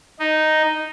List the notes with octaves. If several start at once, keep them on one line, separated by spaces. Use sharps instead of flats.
D#4